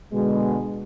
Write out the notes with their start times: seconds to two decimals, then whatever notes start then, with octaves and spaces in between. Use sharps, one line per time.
0.12 B2 D3 G#3